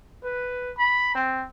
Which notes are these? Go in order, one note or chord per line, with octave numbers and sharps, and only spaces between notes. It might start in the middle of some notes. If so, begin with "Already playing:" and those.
B4
B5
C4